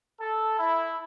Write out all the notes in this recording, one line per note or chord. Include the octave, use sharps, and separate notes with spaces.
A4
E4